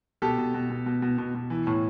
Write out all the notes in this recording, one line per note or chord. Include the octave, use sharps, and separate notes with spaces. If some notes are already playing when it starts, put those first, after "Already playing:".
B2 G4 A4
B2
B2
B2
B2
B2
B2
B2
E3
A2